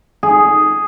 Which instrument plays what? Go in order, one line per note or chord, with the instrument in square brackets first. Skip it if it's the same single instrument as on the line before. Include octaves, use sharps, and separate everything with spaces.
[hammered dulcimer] G#4